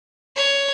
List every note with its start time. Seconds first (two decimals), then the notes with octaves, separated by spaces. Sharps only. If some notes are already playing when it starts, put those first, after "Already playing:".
0.36 C#5